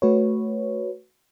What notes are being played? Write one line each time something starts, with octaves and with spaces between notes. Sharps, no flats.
A3 F#4 B4 C#5